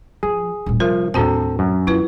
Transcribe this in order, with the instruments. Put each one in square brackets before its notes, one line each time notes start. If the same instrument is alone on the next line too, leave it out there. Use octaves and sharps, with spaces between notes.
[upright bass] F3 [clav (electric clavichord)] G#4
[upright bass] D#1 A2
[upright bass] C3 [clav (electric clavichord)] F3 [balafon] G3 A#4
[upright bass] D#2 A2 [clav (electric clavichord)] C4 A4 [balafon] D4 F#4 A5
[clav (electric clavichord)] F#2
[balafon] E4 B4 [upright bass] F4